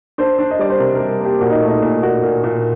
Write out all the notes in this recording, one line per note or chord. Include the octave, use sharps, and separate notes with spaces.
D4 C5
D4
D#5
G3 D5
C5
C3 A#4
G3 A#4
A#3 G4
A#2 F#4
D#4
A3
D#4
A#2
A#2 F#4
A#2
A#2